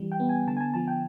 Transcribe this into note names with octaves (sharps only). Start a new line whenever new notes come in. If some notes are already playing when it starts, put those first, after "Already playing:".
Already playing: E3 G3
G5
B3
G#5
D3 A5
G#5
A5
F3 A5
G5